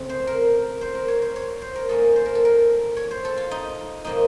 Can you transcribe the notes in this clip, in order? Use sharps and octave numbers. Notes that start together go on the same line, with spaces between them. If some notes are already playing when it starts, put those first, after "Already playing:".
Already playing: C#3 A3 C4
C5
A#4
C5
A#4
C#5
C5
C#5
C5
A#4
D#3 A#3 C#4 A4
C5
A#4
A4
A#4
C#5
C5
A4
F4
D#4
A#2 F3 A#3 D#4